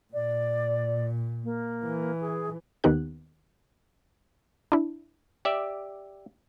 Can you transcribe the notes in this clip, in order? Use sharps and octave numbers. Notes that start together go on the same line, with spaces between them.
A#2 D5
A#3
E3
G#4
D#2 D#3 B3 D#4 G4 F#6
D4 E4
G4 D5 E5